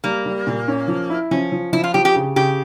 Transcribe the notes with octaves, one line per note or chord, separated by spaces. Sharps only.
G3 A#3
G3
A#2
C#4
F3
E4
F3 C#4
F3
F3 E4
F4
F3 G4
G4
C#3
C#3 G4